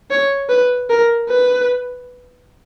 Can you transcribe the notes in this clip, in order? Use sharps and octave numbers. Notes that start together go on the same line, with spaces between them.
C#5
B4
A#4
B4